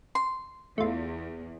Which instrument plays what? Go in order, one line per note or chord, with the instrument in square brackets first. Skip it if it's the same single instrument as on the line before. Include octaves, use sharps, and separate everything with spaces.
[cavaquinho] C6
[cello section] E2 [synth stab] A3 F4